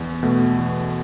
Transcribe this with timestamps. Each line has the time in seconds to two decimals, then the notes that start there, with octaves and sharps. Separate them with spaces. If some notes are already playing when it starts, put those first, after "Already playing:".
Already playing: E2
0.23 B2 A3
0.58 E2